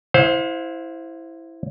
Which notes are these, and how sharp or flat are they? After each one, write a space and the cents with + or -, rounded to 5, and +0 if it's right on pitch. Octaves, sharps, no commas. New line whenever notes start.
E4 +0 C5 +0 F5 +40